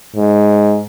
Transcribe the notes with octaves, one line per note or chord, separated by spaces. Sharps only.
G#2